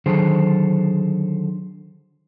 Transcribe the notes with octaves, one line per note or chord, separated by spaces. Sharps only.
D3 D#3 F#3 G#4 A4 C5